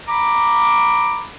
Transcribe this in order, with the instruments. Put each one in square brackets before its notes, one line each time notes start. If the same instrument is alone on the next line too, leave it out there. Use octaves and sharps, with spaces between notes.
[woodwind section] A#5 B5 D6